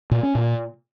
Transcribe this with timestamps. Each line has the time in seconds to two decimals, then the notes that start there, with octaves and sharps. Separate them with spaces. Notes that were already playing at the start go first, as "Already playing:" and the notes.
0.11 A#2
0.23 C#4
0.35 A#2